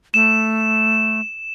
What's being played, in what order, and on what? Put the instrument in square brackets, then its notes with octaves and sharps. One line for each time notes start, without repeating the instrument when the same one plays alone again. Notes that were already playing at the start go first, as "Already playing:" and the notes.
[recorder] A3 [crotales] E7